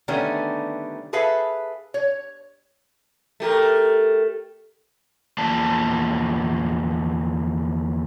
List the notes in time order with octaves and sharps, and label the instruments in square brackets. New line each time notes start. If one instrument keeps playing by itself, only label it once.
[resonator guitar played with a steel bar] D3 D#3 G3 A3 B3 C#4
G#4 A4 B4 E5 F5
C#5
[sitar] A3 G4 A#4
[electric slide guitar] E2 F3 A#3 D5 A5